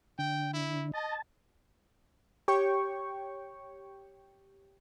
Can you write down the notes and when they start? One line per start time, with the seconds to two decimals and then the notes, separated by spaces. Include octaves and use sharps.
0.19 D3 G5
0.53 E4
0.94 D#5 A5
2.48 G4 C#5 G5 C#6